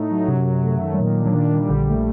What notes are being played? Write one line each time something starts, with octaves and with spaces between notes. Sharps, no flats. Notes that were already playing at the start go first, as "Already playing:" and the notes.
Already playing: A2 A3 D#4
F#3
F#2 C3
F#3
A3
D#3
G3
A#2 F#3
D4
F#3
A#2 D#3
G3
A#1 D3
A3